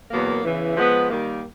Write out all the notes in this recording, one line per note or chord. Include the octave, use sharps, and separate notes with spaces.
E2 B2 F#3 A#3
E2 C#3 E3
F3 G#3 B3
D#3 G3 A#3